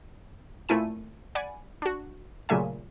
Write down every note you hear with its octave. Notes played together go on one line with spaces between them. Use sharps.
A#2 A3 C4 E4 G#5 D#7
D5 F#5 G#5 B5
D4 F#4
A#2 C#3 F#3 A3 E5 G#5